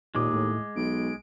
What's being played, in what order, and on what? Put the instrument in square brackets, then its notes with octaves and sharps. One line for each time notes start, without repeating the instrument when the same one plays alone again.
[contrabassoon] D#2 [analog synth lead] A#2 [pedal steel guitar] G#3 D6 D#6
[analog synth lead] A2
[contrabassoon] B1 [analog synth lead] D7